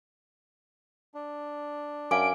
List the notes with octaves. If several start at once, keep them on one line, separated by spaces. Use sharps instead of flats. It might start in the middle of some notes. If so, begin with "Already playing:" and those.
D4
F#2 F5 G#5 D6 D7